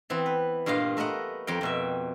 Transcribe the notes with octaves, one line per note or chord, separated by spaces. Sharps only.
E3 B3 C4
B4
G2 A#2 F4 D#5 F5 G5
A3 A#4 B4 D#5 F#5
F2 A#4 G5
F2 B2 E5